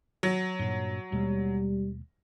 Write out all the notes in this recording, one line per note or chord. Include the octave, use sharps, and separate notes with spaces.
F#3
G2 A#2
D#2 B2 G3 G#3